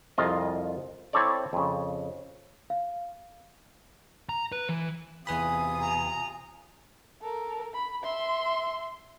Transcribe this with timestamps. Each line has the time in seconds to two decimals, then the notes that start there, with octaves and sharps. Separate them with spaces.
0.18 C2 F2 F4 D#5
1.13 C4 E4 A4 C#5 D5
1.53 F2 C#3
2.70 F5
4.29 A#5
4.52 B4
4.69 E3
5.27 E2 C3 F4 B4 G#5 B5 D#6
5.81 A#5
7.22 A4 A#4
7.74 B5
8.04 E5 C6